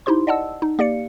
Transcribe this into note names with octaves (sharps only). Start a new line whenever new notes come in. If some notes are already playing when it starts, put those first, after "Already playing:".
D#4 E4 G4 C5 C6
D5 D#5 F#5 A5 E6
D#4
A#3 G4 D5 F5 C#7